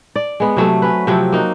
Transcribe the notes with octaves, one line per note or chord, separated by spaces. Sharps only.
D5
G#3 B3
C3 F#3 A3
C#4 B4
C3 F3 F#3 C4
A#3 D#4 F#4